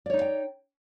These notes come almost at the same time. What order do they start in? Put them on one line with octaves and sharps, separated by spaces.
D5 C#5 D#4 E4 G5